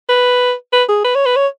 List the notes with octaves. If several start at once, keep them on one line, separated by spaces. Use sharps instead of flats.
B4
B4
G#4
B4
C#5
B4
C#5